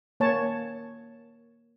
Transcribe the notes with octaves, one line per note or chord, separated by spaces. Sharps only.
A#3 C#5 A5